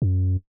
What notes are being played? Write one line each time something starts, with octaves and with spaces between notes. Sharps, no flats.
F#2